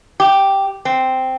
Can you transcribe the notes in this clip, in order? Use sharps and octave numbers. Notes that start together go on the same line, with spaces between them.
G4
C4